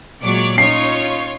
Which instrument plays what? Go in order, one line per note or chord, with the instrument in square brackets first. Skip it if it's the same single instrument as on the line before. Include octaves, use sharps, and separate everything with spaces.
[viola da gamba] A#2 F#3 G#3 [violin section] C#5 D5 D6
[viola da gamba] C#4 D#4 [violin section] F4 C#5 [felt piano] C7